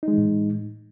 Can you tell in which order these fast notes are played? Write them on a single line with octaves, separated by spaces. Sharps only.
D#4 G#3 E3 A2